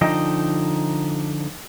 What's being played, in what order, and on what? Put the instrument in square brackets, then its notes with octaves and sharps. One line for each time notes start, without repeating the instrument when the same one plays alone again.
[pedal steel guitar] D3 F3 D#4 D#5 G5